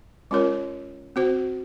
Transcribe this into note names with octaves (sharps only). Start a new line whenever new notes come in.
G#3 C#4 F4 A#4 C#5
C4 F#4 C5